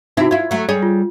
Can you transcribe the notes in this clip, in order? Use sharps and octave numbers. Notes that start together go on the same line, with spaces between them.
C3 C4 D#4 E4 F#4
E4 F4 G#6
F#3 A3
G3 G#4 C#5
F4